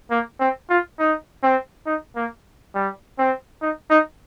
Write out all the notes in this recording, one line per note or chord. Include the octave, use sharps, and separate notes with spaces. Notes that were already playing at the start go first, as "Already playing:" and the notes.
A#3
C4
F4
D#4
C4
D#4
A#3
G3
C4
D#4
D#4